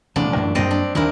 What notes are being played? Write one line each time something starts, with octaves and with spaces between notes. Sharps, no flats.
D#1 A1 C3 D4
A1 F#2
F#2 G3 A#3 C4 D#5
D4
D#2 D#3 D4 E4 A#4